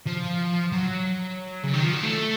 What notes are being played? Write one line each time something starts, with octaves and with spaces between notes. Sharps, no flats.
F3
F#3
C#3
D#3
F3
F#3
A3